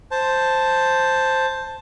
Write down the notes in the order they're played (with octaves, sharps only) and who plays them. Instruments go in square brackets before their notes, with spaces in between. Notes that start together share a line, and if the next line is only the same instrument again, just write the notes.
[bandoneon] C5 A5